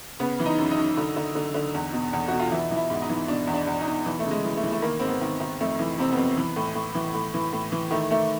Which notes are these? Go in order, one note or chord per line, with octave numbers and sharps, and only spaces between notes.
C#3 B3
E3
D#4
F#2
D#4
F#2
D3
D3
D3
D3
E2
B2
E2
B2 F#4
F4
E3 E4
E3
E4
G#2
D#4
E3
B2 D4
E2
D4
E2
D#4
B2
E3
A3
C#3
G#3
E3
A3
E3
A3
D#3 A#3
G#2 C4
B3
D#3
D#3
F2 A3
E3
C3 C4
B3
F2
E3
A2
A2
E3
A2
E3
A2
E3
D#3 A3
D#3 A3